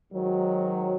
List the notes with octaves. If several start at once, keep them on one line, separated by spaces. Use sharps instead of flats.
G#2 D#3 F#3